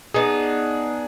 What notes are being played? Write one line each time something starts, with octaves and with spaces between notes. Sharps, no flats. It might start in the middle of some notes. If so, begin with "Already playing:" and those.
B3 D4 D#4 G#4